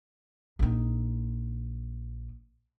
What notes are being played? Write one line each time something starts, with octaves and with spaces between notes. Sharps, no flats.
A#1 D#4